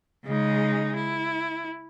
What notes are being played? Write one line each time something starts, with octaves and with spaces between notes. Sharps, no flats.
C#3 G#3 D#4
E4